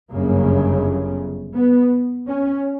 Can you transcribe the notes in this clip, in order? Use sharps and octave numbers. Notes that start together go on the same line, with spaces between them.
G1 F#2 C#3 A#3
B3
C#4